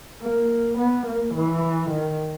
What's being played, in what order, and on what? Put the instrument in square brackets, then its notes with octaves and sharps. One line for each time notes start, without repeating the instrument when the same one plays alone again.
[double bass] A#3
B3
A#3
E3
D#3